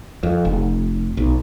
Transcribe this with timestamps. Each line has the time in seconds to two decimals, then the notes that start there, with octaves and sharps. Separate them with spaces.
0.23 F2
0.45 F1
1.17 B1